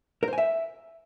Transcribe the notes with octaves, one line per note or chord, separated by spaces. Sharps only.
A#4
C5
G#5
E5